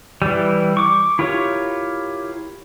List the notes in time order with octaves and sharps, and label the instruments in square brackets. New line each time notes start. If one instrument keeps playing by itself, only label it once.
[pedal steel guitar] E3 G3
C#6 D6
E4 F4 G4 A#4 C#5